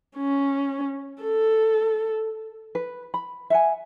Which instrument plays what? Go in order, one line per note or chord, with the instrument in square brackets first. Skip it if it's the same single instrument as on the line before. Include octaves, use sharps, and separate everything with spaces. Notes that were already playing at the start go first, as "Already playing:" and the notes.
[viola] C#4
A4
[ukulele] B4
B5
E5 F#5 G#5